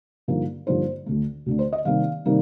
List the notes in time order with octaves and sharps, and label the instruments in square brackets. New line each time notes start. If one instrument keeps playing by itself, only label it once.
[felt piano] G2 D3 F3 A#3 D#4
G2 D3 F3 A#3 D#4 C5
D2 D3 A3
D2 D3 A3
C5
D#5
C3 D#3 G3 A#3 D#4 F5
C3 D#3 G3 A#3 D#4